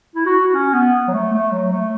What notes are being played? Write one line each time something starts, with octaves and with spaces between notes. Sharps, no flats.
E4
F#4
F#4
C#4
B3
F#3
A3
A3
F#3
A3